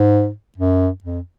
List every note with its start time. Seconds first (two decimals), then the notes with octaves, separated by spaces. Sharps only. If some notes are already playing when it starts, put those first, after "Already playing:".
Already playing: G#2
0.58 F#2
1.04 F2